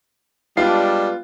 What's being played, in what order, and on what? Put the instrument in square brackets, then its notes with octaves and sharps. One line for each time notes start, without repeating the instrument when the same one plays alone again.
[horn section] G3 G#3 D4 [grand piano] B3 F4 C7